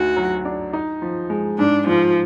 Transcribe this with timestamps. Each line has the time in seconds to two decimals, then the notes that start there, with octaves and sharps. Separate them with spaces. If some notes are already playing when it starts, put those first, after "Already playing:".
Already playing: D2 D#4 F#4
0.17 F#3
0.45 D4
0.73 D#4
1.02 F3
1.30 G#3
1.58 G#2 D4
1.87 G#2 F3